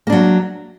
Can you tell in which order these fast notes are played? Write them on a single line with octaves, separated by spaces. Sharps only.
A#3 D4 F#3